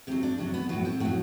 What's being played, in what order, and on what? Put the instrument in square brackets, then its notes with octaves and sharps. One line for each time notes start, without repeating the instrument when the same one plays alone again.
[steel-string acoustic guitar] C3 F#3 C4
D4
C3 F#3 D4
B3
A2 F#3 B3
C4
A2 F#3 F#4